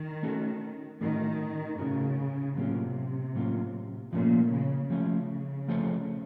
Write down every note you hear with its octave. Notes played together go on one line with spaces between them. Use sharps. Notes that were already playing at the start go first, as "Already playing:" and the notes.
Already playing: D#3
A3 C#4 F#4 A4
A2 D#3 A3 C#4 F#4 A#4
A2 C#3 A3 C#4 F#4 A#4
A2 C3 F#3 A#3 C#4 F4
A2 F#3 A#3 C#4 F4
A#2 F3 A3 C#4
C#3
C#3 F3 A3 C#4
F3 A3 C#4 A4 C5